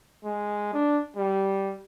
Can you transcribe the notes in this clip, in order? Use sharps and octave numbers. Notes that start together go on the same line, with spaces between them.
G#3
D4
G3